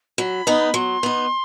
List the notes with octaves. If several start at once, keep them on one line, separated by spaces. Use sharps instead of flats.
F#3 B5
B3 D#4
F#3 C6
B3 D#4